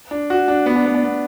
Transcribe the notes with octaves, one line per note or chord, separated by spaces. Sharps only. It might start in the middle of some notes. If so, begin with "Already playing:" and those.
D4
F#4
D4
B3
D4
B3
D4
B3